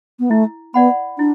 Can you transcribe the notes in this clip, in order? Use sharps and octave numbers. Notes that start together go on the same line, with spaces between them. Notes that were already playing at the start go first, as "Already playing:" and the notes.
B3
A3 E4
B3 D5 F#5 B5
D4 E4